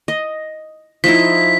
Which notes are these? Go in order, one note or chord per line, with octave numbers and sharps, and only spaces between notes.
D#5
F3 D#4 E4 B6